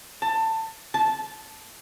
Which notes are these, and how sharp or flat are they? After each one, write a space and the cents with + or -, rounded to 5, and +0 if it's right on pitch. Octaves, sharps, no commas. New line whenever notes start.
A5 +20
A5 -15